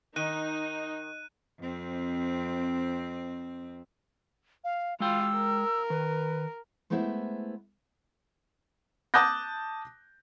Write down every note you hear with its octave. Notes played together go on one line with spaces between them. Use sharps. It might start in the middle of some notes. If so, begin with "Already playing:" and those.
D#3 D#4 F#6 D#7
F2 C4
F5
G#3 F4 G5 E6
A#4
D#3 B4
G#3 A3 B3 E4 C5 E5
A5 D6 D#6 F#6 G6 A#6